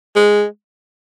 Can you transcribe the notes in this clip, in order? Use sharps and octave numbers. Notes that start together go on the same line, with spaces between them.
G#3